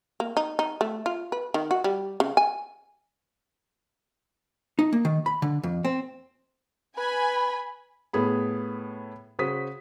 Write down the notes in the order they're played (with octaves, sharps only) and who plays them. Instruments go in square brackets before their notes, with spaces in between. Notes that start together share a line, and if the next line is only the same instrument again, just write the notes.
[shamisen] A#3
D#4
D#4
A3
F4
B4
D#3
F#4
G3
C#3
G#5
[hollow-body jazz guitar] D#4
A#3
D#3
B5
D3
F2
C4
[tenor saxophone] B4 [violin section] G#5 B5
[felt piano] A2 B3 G#4 B5
C#3 F#4 C5 D#6 B6